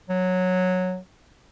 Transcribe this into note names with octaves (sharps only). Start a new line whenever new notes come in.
F#3